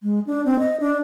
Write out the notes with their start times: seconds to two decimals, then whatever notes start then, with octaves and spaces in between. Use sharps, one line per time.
0.03 G#3
0.27 D4
0.45 C4
0.59 D#5
0.80 D4